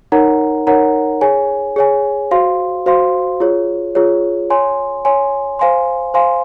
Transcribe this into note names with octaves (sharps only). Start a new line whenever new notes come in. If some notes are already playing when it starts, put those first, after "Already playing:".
D#4 A#4 C#5 F#5 A#5
D#4 A#4 C#5 F#5 A#5
G#4 C#5 G#5
G#4 C#5 G#5
F#4 C5 F5 C6
F#4 C5 F5 C6
F4 G#4 C#5
F4 G#4 C#5
C#5 G#5 C6
C#5 G#5 C6
C5 F5 G#5 C6
C5 F5 G#5 C6